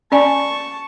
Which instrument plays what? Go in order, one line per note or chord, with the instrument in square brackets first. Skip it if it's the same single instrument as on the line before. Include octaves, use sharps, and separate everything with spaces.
[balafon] C#4 D5 G#5 [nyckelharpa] A5 C#6